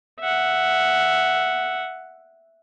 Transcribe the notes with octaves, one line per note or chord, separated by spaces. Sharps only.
E5 F#5